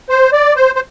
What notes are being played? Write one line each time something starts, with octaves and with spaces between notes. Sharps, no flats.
C5
D5
C5
C5